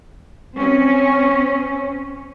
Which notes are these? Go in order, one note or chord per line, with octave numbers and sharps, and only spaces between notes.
C4 C#4